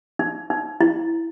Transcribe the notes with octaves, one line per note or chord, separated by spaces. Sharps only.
D#4
D#4
E4